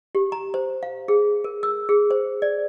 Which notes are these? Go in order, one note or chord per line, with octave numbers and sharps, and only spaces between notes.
G4
A#5
C5
F5
G#4
A#4
E6
G#4
C5
D5